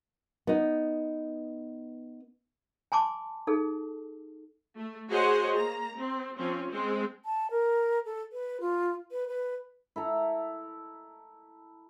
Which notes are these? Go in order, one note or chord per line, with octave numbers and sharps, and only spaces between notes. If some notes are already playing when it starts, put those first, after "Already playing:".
B3 D#4
G#5 A5 C6 D6
D#4 G#4 A4
A3
F#4 G#4 C5 C#5 D#5 F#5
A#3 A#5
C4
F3 C4 C#4
G#3 C4
A5
A#4
A4
B4
F4
B4
B4
E4 A4 A#5